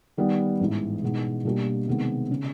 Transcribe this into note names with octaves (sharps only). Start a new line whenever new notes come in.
D#3 G3 B3
A1 G#2 E3
B2 G#3 B3 D#4
B2 G3 A#3 D4 G4
C3 D#3 G#3 B3
C#3